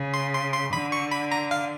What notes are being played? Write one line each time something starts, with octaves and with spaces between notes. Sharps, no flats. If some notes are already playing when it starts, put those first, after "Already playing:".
Already playing: C#3
C6
C6
C6
D3 B5
C#6
B5
A#5
F5